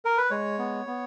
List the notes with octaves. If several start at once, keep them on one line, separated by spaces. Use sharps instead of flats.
A#4
B4
G#3 C#5
B3
B3